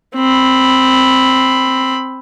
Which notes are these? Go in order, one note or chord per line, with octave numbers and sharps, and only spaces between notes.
C4 B5